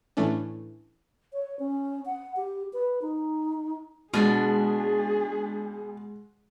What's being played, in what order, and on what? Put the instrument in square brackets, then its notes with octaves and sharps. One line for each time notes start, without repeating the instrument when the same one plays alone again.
[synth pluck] A2 E3 A3 C#4 D4
[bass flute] C#5
C#4
F#5
G4
B4
D#4
[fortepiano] B2 [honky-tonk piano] G#3 [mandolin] C#4 D4 F4 [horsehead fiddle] G#4